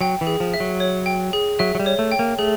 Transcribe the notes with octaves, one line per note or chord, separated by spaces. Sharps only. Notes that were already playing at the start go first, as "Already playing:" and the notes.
F#3 G5
E3
G#4
F3
E5
F#3
C#5
G5
G#4
F#3 E5
F#3
G3
C#5
A3
G5
A#3
A3 G#4